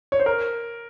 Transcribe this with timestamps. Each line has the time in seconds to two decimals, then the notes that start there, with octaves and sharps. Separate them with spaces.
0.12 C#5
0.20 C5
0.26 A#4